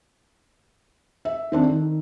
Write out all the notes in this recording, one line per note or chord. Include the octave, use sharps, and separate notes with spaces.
E5
D#3 C4 D4
D#3